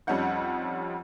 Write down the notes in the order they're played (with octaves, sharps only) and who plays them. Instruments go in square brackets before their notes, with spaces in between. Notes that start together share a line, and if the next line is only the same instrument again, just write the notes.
[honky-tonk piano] F2 G3 C#4 D#4 F#5 G6